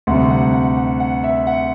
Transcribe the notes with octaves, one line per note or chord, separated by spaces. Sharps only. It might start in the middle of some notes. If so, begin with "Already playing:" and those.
D2 C3 G3 F#5
F#5
F#5
F#5
F#5
E5
F#5